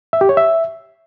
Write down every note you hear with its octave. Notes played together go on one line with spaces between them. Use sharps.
E5
G4
C#5
E5